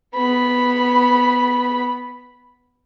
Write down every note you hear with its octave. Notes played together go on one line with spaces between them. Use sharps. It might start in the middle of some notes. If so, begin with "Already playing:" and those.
B3 B5